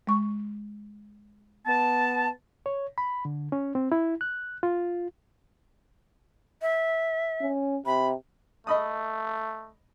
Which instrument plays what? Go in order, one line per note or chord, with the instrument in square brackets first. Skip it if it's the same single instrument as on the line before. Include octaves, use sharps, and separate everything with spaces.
[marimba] G#3 C#6
[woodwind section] B3 A5
[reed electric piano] C#5
B5
D3
C#4
C4
E4
F#6
F4
[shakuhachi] E5
[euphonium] C#4
[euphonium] C3 [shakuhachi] B5
[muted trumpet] A3 [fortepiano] D#5 B5 D#6